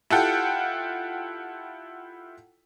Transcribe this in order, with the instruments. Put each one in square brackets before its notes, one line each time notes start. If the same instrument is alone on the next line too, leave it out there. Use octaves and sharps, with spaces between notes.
[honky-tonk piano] E4 F4 G4 A4 F#5 G5